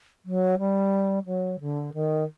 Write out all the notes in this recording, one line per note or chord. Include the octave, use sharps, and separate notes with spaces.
F#3
G3
F#3
D3
D#3